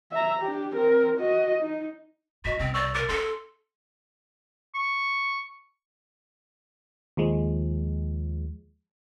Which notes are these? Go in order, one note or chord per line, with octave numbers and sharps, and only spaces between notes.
E5 A#5
D4 G4
C4 A#4
F#4 D#5
D#4
G#2 F#4 D#5 B6
C2 B2 C4
D5 C#6 E6
A#4 D6 A6
C#4 A4 C6
C#6
D#2 F3 G#3